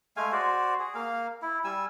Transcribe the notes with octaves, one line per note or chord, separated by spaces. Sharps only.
G#3 A3 F5 G#5
F#4 C5 D5
G#4
A#3 F5
E4
G3 G#5 E6